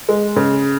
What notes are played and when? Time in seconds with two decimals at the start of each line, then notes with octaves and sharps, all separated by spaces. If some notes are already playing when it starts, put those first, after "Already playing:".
0.09 G#3
0.36 C#3